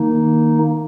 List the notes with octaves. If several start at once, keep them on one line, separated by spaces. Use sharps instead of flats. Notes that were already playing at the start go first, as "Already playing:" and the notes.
Already playing: D#3 A#3 D#4